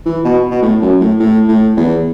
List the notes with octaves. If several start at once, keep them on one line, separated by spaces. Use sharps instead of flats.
E3
B2
B2
A2
F#2
A2
A2
A2
E2